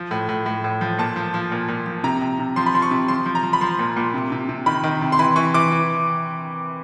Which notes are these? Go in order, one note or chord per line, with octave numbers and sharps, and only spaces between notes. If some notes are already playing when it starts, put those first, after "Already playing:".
Already playing: F3
A2
A2
A2
A2
F3
A#2 A5
F3
F3
A#2
A#2
F3
C3 A#5
C3
C3
F3 C6
B5
F3 C6
C#6
C3
F3 C6
F3
A#5
F3
B5
F3 C6
A#2
A#2
C3
C3
C3
D#3 B5
D#3
C3
C6
E3 B5
E3 C#6
E3 D6
E3